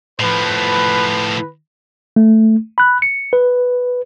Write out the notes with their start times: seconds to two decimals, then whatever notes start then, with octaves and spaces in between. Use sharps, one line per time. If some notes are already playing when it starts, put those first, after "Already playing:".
0.20 A2 F3 B4
2.16 A3
2.78 B5 F#6
3.02 C#7
3.33 B4